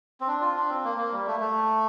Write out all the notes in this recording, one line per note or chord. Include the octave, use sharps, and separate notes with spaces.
C4
D4
F4
D4
C4
A#3
A#3
G3
A3
A3